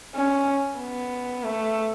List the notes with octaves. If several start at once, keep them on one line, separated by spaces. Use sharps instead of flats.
C#4
B3
A3